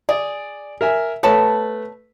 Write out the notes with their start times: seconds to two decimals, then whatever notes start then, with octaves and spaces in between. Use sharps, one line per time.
0.09 G#4 D5
0.81 A#4 E5 G#5
1.23 A3 B3 B4 C#5 A5